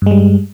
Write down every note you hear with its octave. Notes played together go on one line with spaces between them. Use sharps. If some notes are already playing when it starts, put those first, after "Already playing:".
G2 G3 G#3